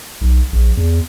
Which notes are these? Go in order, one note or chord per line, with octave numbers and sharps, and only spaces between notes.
B1
A#1
E2